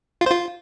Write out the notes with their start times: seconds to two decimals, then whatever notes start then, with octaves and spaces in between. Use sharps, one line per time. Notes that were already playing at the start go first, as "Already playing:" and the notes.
0.21 F4
0.26 C5
0.32 F4